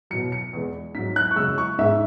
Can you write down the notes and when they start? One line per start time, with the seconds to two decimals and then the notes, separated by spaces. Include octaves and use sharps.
0.11 B2 F#3 C#7
0.32 C#7
0.53 E2 E3 G#3
0.95 G#2 F#3 B6
1.16 F#6
1.31 C#6
1.36 F#2 C#3 G#3 E6
1.58 C#6
1.78 G#2 G#3 E5